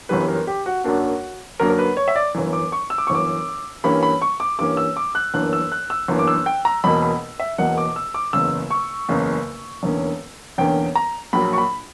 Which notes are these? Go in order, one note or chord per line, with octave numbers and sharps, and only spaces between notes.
G1 F#2 E3 G3 B4
A#4
G4
F#4
F#2 D3 F#3 A#3 D4 F#4
F#2 D3 F#3 A#3 D4 A#4
A#4
B4
C#5
E5
D5
G1 F#2 E3
D6
C#6
E6
D6
G1 F#2 E3 C#6
D6
G2 E3 A#3 C#4 B5
B5
C#6
D6
G2 E3 A#3 C#4 D6
E6
D6
F#6
G1 F#2 E3 A#3 D4 F#6
E6
F#6
E6
G1 F#2 E3 A#3 D4
D6
E6
G5
A#5
E1 E2 B2 A#3 B5
B5
E5
E1 E2 B2 A#3 F#5
D6
E6
D6
F#1 E2 C#3 E6
C#6
F#1 E2 C#3
E1 E2 D3 A#3 C#4
E1 E2 D3 A#3 C#4 G5
A#5
A#1 A#2 F#3 A#3 B5
C#6
B5